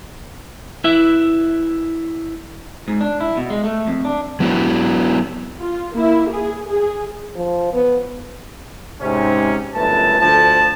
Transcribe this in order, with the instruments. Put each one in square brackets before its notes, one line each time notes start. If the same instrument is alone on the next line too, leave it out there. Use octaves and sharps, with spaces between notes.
[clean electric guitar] E4 B4 E5
G#2
D4
E4
B2
G#3
A3
F2
D4
[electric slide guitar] F#3 B3 E4 F#4
[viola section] F4
A#3 E4
G#4
G#4
[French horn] F3
B3
[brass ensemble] G#2 C3 C#4
G1 F#2 A3 B4 A5
D2 F3 A4 A5